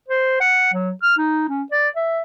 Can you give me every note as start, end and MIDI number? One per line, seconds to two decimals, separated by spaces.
0.08 0.39 72
0.40 0.70 78
0.73 0.91 54
1.02 1.14 89
1.18 1.46 63
1.49 1.63 61
1.71 1.88 74
1.96 2.22 76